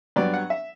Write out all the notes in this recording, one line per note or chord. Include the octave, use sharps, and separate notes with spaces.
G2 F#3 B3 D5
F#5
E5